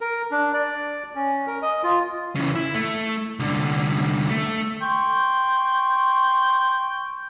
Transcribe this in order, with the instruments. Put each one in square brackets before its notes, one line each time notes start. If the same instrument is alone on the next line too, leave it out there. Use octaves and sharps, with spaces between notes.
[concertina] A#4
D4
D5
C#4
A#4
D#5
F4
[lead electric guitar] C#3 E3
E4
A3
C2 D3
A3
[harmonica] G5 C6 C#6